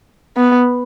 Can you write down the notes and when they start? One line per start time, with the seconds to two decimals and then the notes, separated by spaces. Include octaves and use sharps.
0.37 B3